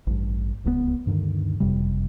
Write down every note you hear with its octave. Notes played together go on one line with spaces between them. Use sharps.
A1 G2
D1 C#2 C3 B3
D2 G2 D3 D#3
F#1 F2 C3 G3